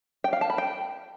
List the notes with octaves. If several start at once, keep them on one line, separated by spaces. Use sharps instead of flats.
G5
F5
A5
B5
G5